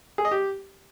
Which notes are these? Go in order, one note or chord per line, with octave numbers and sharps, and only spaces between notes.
G#4
D#5
G4